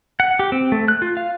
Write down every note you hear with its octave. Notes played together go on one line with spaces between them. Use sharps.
F#5
G4
C4
A3
F#6
F4
F5